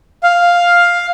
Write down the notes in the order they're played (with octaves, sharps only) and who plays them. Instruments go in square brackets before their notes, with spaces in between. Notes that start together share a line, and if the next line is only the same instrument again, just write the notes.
[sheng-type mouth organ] F5